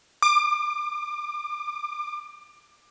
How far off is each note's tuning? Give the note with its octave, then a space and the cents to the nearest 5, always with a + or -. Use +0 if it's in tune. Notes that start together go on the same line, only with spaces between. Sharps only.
D6 +30